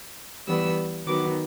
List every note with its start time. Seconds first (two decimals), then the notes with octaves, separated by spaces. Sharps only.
0.47 E3 G3 B3 E6
1.07 D#3 F#3 B3 D6